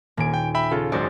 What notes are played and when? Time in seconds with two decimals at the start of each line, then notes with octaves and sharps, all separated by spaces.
0.17 D#1 A#3 G#5 D7
0.34 G5
0.55 E5 G5 B5
0.71 C#3 F4 A4
0.92 G#1 F#2 G#3 F#4 C5 D5